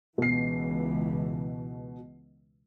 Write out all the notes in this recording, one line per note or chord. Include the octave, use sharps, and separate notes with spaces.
C#2 B2 E3 C7